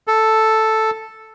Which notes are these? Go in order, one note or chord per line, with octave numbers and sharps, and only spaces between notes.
A4